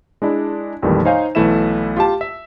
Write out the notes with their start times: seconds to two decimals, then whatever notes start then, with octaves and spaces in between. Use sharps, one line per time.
0.22 G#3 D4 E4
0.82 A#1 F2 D#3 E3 G3 A3
1.05 D#4 C5 C#5 F5 G#5
1.35 B1 E3 A3 E4 E5 E7
1.97 F4 G4 A5
2.21 E5